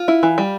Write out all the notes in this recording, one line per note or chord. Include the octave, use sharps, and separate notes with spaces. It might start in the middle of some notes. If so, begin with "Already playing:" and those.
Already playing: F4
E4
E3
G3